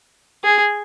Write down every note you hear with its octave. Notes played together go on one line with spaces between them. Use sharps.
G#4